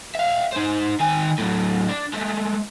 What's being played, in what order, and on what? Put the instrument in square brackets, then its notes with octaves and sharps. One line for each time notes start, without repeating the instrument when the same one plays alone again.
[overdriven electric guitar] E5 F5
D#4 C5
D#3 G#5
A2 F#3
D4
G#3 A3